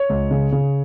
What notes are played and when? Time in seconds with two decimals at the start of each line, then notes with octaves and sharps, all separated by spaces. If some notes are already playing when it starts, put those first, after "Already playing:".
Already playing: C#5
0.09 C#2
0.31 C#3
0.52 C#3